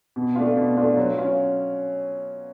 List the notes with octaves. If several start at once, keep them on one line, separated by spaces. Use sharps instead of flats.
B2
A3 D4 F4
B2
A3 D4 F4
F#3
C#4 F4